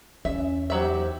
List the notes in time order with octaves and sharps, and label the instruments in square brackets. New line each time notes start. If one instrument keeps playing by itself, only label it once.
[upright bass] E2 [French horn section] C#4 [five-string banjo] E5
[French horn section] D#2 C5 [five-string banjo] F#3 E5 [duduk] G4